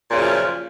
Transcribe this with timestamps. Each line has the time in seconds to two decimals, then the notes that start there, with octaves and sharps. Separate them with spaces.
0.09 A#2
0.13 C#3
0.17 F#2
0.21 F3